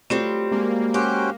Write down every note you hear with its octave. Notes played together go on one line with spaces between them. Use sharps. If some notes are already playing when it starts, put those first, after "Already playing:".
F#3 G3 A3 C4 F4 E7
G#3 A#3
C#4 F#4 G4 C5